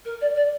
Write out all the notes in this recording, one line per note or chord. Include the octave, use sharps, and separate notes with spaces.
A#4
D5
D5